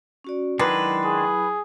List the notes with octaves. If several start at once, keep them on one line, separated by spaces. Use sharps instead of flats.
C#4 F#4 D5
D#3 F#3 G#3 D4 E4 B4
G#4